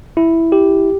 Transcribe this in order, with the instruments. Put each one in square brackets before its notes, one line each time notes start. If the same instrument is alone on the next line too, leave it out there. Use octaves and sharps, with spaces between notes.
[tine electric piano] E4
G4